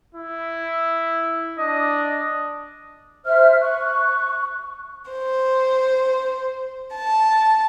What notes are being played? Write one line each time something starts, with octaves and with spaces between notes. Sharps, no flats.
E4
D4 D#5
C5 E5 F6
C#6 F#6
C5
A5